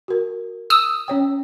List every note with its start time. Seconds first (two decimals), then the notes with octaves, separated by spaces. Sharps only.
0.08 F#4 A#4
0.70 D#6 E6
1.08 C#4 C#5 G5